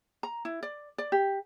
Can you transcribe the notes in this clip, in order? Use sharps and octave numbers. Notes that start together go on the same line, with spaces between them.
A#5
E4
D5
D5
G4